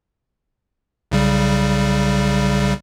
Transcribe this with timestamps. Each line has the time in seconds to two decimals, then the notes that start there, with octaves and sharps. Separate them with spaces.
1.12 B1 C#3 G3